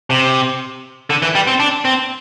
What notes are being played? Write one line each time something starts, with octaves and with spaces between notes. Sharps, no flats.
C3
D3
E3
G3
C4
D4
C4